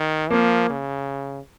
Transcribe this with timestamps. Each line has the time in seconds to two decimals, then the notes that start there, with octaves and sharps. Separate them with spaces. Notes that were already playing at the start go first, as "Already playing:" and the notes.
Already playing: D#3
0.30 F3 A#3
0.69 C#3